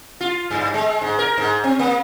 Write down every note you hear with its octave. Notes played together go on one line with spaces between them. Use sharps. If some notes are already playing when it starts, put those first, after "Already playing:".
F4
G2
G#3
G#2
A#4
G#2
C4
A#3